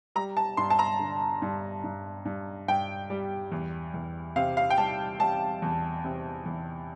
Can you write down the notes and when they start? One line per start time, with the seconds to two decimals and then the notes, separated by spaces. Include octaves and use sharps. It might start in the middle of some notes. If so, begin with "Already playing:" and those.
0.16 G3 A#5
0.37 A5
0.57 G2 C6
0.70 A5
0.79 A#5
0.99 D3
1.42 G2
1.84 G2
2.25 G2
2.68 G2 G5
3.10 G3
3.52 E2
3.94 E2
4.36 C3 F5
4.57 F5
4.70 G5
4.78 G3 A5
5.19 G3 A5
5.62 E2
6.04 C3
6.46 E2